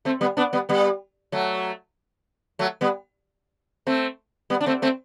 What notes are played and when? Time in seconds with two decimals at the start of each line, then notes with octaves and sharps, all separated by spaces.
0.05 A3 C4
0.21 G3 B3
0.37 B3 D4
0.53 G3 B3
0.69 G3 B3
1.32 F#3 A3
2.59 F#3 A3
2.81 G3 B3
3.87 A3 C4
4.50 G3 B3
4.61 D4
4.66 A3 C4
4.82 A3 C4